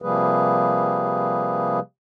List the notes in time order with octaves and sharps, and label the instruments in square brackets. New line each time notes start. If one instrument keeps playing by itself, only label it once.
[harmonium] C3 F3 G3 A#3 G#4 B4